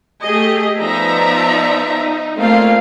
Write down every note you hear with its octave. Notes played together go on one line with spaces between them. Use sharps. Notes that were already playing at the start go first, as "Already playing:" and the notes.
A3 G4 G#4 D#5
F3 B3 D#4 D5 E5 A#5
D#4
A3 A#3 C4 F4 D5 F5